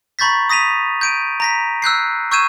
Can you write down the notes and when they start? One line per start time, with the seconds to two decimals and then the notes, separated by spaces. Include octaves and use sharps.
0.19 A#5 B5 C#6 G6 A6 B6
0.50 D#6 A#6 B6 D#7 F7
1.01 G6 D7 D#7
1.40 A#5 A#6 B6
1.82 E6 F#6 G6 C7
2.31 C#6 E6 G6 G#6 D#7 E7